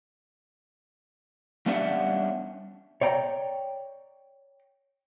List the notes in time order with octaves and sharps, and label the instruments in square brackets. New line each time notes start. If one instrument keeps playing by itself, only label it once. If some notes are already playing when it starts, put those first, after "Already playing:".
[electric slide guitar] G3 B3 C#4 D4 E5 F#5
[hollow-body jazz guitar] C#5 D5 G5 A#5